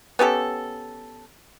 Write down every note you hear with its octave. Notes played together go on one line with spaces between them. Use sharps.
B3 C#4 G4 A4